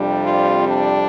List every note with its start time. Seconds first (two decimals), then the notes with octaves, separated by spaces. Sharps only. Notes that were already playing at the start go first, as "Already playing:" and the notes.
Already playing: F2 C3 G3 D4
0.24 F4
0.68 D4